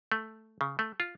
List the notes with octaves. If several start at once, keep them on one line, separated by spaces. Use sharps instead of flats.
A3
C#3
A3
F4